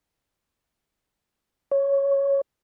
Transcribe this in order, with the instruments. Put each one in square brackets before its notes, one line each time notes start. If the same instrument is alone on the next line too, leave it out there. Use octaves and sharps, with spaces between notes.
[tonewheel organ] C#5